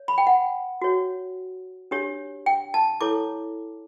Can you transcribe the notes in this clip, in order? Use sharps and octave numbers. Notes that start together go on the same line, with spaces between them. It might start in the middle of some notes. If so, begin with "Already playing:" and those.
Already playing: C#5
B5
G5
F#5
F#4 C#5
D4 G4 C#5
G5
A5
E4 A4 C#5 D6